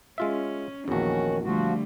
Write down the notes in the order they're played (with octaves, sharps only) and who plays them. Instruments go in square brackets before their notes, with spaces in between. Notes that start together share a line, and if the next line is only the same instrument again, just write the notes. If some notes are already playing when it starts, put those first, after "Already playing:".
[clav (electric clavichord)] G#3 F4 E5 [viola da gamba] C#4
[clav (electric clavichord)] A#1 E2 [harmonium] D#3 C#4 [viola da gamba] F#4
[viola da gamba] D3 G3 A3 [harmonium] F3 F#4